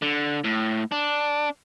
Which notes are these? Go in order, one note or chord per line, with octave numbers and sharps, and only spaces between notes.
D3
A2
D4